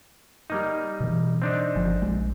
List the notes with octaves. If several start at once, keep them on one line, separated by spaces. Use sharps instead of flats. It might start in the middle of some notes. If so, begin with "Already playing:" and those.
G3 A#3 D#4
B2 E3
C4 D4 D#4
G1 F3
A#1 G#3